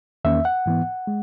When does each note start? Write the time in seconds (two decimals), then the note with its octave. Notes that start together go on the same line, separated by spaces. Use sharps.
0.25 E2 D#3 A#3 C#4 E5
0.45 F#5
0.66 G#2 E3 B3
1.07 G#3